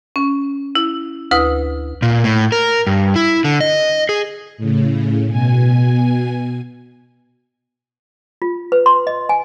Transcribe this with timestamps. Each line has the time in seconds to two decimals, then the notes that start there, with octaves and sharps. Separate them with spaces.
0.16 C#4
0.75 E4
1.31 D2 E4 B4 D#6
2.02 A#2
2.24 A2
2.52 A#4
2.87 G2
3.16 E4
3.44 D3
3.61 D#5
4.09 G#4
4.58 A2 C#3
5.27 B2 G#5
8.42 F4
8.72 B4
8.86 C6
9.07 D#5
9.29 G#5